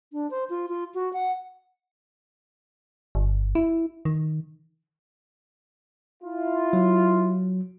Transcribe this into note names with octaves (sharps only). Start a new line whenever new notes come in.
D4
C5
F4
F4
F#4
F#5
G1
E4
D#3
E4 F4
F#3